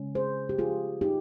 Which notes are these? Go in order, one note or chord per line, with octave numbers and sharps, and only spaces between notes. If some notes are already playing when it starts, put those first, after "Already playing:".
Already playing: C#3 G#3 C#4
G#4 C5
G4
F4 G#4
D#4 G4